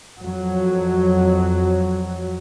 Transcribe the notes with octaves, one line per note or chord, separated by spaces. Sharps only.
F2 F#3